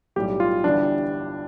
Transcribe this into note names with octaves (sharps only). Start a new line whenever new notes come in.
B1 A2 G3 G4
F4
G1 G2 E3 G3 D4